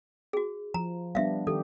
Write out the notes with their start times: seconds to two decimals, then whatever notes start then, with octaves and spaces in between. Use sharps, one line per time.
0.33 F#4 G#4
0.74 F3 A#5
1.15 G3 B3 D4 E5 F5
1.47 D#3 G4 A4